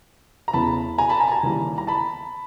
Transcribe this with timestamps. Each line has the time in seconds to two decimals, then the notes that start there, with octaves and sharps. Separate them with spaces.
0.48 A#5
0.53 E2 C#3 E3 A5 B5
0.98 G#5 A#5
1.09 A5 B5
1.20 G#5 A#5
1.28 A5
1.32 G#5 A#5
1.43 D#2 C#3 E3 G3
1.78 A#5
1.87 A5 B5